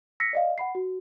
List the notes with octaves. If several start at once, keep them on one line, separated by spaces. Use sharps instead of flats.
E6 A#6 B6 C#7
D5 D#5 F5
F#5 B5 C7
F#4